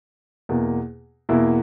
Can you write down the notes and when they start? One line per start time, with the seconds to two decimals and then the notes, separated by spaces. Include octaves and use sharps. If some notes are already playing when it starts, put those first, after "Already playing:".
0.49 E2 B2 A#3
1.29 E2 B2 A#3 E4